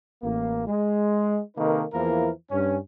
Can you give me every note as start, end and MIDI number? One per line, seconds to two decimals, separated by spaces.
0.23 0.65 33
0.23 0.65 58
0.68 1.38 56
1.56 1.83 48
1.56 1.83 51
1.56 1.83 58
1.56 1.83 63
1.56 1.83 69
1.56 1.83 71
1.93 2.30 40
1.93 2.30 52
1.93 2.30 53
1.93 2.30 58
1.93 2.30 64
1.93 2.30 70
2.51 2.77 43
2.51 2.77 61